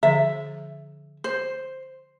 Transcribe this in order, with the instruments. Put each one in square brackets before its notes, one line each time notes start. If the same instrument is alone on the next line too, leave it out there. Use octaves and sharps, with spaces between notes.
[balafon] D3 F3 [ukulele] E5
[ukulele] C5